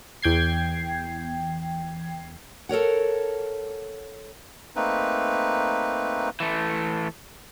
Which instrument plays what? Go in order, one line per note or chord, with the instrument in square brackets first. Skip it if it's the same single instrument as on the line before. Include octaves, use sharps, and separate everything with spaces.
[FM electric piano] E2 G5 G#6 C7
[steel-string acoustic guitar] A4 A#4 C#5 F#5
[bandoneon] A3 A#3 C4 D#4 B4
[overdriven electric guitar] E3 A3